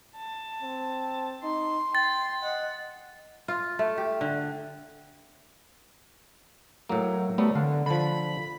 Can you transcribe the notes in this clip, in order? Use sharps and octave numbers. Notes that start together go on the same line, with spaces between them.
A5
C4
D#4 C6
G5 A6
D#5 F#5
F4
A3
G4
D3
A2 F#3 A#3
F#3 G3 A3 B3
D3 F5
D3 F3 B5